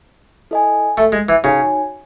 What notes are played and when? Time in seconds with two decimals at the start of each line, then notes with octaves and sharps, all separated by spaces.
0.51 E4 A4 D#5 G#5
0.97 A3
1.12 G#3
1.29 E3
1.44 C#3 D#4 F#4 C#5 G#5